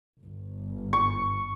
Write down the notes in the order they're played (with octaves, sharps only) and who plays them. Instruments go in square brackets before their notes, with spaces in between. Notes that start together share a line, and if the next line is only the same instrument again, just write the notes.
[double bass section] G1
[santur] C#6